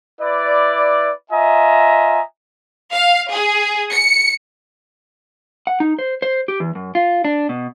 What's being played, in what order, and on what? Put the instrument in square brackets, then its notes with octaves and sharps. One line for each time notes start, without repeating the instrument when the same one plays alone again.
[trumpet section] E4 B4 D5
F4 D#5 E5 G#5 A#5
[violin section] F5
G#4
C#7
[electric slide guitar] F#5
D#4
C5
C5
G4
E2
F#2
F4
D4
B2